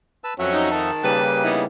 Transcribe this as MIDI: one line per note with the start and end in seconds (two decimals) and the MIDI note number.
0.24 0.34 71
0.24 0.34 81
0.24 0.34 88
0.39 0.91 41
0.39 0.70 54
0.39 0.70 61
0.39 0.91 76
0.39 0.91 78
0.52 0.90 63
0.71 1.23 51
0.71 1.23 81
1.03 1.65 49
1.03 1.65 55
1.03 1.65 58
1.03 1.48 67
1.03 1.48 68
1.03 1.48 71
1.44 1.62 59
1.44 1.62 63
1.44 1.62 64